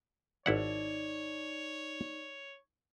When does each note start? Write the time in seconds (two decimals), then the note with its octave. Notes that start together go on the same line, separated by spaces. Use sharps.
0.46 G#1 D#4 E4 C#5 D5 F#5